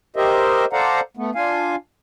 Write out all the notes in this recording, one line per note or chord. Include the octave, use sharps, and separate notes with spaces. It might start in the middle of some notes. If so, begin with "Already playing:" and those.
G4 A#4 C5 D#5 E5
A4 C5 D5 F5 F#5 A#5
A3 B3
D4 F4 F5 G#5